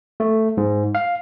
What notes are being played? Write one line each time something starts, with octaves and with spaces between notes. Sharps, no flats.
A3
G#2
F5